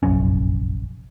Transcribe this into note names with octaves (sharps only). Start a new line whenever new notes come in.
F1 A#1 F#2 C#4